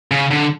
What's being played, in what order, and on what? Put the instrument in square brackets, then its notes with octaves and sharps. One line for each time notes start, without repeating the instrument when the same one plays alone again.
[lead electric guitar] C#3
D3